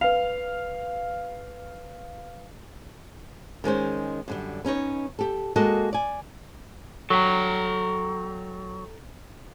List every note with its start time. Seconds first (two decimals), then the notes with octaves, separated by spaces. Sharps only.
0.01 B4 F5 F7
3.64 D#3 G#3 C#4 C5
4.28 F#2 D3 G3
4.65 B3 C#4 D#4 C#5
5.19 G4 A4
5.56 G#3 A#3 F#4 A4 D#5
5.93 D5 G#5
7.10 F#3 A4 G5 A#5